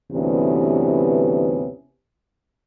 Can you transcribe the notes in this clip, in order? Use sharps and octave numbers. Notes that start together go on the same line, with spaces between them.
D2 G2 C3 E3 B3 C#4